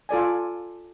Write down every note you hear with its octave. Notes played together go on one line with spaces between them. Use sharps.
F4 A4 D5 G#5